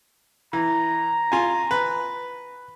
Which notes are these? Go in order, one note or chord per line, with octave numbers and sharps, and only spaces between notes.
E3 A#5
F4 G#5
B4